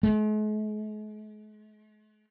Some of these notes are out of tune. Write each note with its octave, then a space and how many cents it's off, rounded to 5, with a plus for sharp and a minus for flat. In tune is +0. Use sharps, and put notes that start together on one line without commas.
G#3 +45